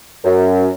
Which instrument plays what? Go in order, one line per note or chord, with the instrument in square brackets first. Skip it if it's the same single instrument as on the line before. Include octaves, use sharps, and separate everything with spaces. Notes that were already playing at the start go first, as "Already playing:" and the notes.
[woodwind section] F#2